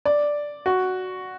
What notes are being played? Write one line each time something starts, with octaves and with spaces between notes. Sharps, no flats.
D5
F#4